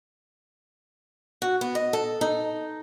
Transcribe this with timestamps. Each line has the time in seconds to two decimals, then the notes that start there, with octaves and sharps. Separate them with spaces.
1.42 F#4
1.61 B3
1.75 D#5
1.93 A4
2.21 D#4